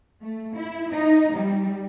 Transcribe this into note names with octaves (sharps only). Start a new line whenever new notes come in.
A3
E4
D#4
G3